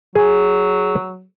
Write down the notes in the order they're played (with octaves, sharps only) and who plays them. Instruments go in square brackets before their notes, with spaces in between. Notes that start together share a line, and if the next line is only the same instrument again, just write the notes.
[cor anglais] F#3 [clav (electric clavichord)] G#4